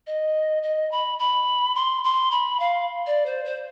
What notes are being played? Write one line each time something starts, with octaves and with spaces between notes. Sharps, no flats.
D#5
D#5
B5
B5
C6
C6
B5
F5
D5
C5
C5